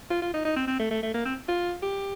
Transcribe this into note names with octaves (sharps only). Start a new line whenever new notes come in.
F4
F4
D#4
D#4
C4
C4
A3
A3
A3
A#3
C4
F4
G4